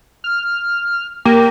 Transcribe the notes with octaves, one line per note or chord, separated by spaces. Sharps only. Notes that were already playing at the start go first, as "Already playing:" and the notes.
F6
A#3 G4